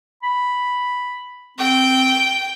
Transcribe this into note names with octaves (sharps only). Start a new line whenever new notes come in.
B5
C4 G5